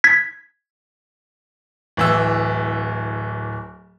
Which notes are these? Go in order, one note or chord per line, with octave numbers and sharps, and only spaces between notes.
G#6 B6
D1 E3 E6